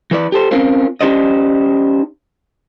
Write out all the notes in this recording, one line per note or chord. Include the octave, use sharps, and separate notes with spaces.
E3 B4 D5
G4 A4 C5
C4 C#4 F4 A#4 C5
C#4 D#4 G4 C5 D5 D#5